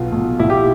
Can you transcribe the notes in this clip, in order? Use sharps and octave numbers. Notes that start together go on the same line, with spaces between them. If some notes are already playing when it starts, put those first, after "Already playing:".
Already playing: B1 B2 F4
B1
B1 E4
G4